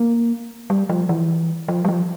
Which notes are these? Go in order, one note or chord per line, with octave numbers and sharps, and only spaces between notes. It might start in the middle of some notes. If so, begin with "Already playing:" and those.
Already playing: A#3
G3
F3
E3
F3
G3
F3